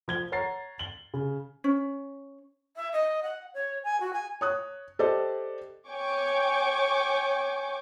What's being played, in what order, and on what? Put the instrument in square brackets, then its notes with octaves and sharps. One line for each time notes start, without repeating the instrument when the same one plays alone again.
[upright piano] F3 G#6 G7
C#5 F#5 A#5 A6 C7
F#7 G7
C#3
[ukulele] C#4
[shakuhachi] E5
D#5
F#5
C#5
G#5
F#4
G#5
[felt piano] C#5 D#6 F#6
G4 A4 C5 D5 D#5
[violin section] C#5 G5 G#5 C#6 D6